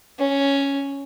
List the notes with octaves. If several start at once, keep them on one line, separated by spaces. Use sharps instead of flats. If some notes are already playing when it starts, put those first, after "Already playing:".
C#4